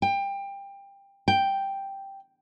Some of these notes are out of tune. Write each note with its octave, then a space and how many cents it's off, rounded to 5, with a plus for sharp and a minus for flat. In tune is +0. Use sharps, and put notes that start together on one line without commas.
G5 +20
G5 +0